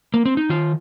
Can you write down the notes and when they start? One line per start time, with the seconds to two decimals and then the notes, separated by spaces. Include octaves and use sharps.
0.14 A#3
0.25 C4
0.37 D#4
0.49 D#3 F4